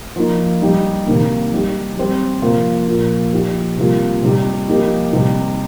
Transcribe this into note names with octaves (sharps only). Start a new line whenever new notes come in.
F3 A#3 D#4
G3 D#4 G4
C3 D#3 A#3
G3 D#4 G4
G3 C4 G4
C3 F3 A#3 F4
A#2 F3 A#3 F4
F3 D#4 G4
C3 G3 A#3 F4
C3 G3 D#4 G4
F3 A#3 D#4 G4
C3 G3 D#4 G4